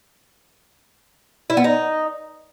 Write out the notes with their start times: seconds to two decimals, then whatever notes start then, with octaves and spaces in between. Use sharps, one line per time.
1.50 E4
1.57 B3
1.64 D#4